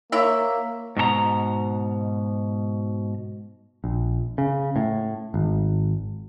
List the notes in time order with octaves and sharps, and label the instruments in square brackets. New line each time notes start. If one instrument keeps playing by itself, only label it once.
[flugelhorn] A#3 [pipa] E4 C#5 E5
[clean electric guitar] G#2 B2 A4 A#5
[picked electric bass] A#1
C#3
A2
G#1